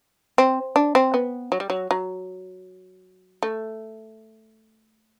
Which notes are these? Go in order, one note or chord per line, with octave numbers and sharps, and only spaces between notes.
C4
D4
C4
B3
F#3
G3
F#3
F#3
A3